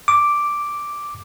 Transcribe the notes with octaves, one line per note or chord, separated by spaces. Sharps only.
D6